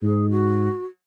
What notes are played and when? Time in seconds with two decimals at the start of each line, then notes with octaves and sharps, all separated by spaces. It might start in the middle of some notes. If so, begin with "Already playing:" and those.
0.02 G#2 G#4
0.31 F#4